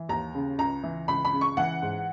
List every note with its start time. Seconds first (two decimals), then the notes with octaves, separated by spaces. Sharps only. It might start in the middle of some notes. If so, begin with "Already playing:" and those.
Already playing: E3
0.09 D#2 A#5
0.35 C#3
0.59 C#2 A#5
0.83 E3
1.08 C#2 B5
1.25 B5
1.33 C#3
1.41 C#6
1.57 E3 F#5
1.82 G#2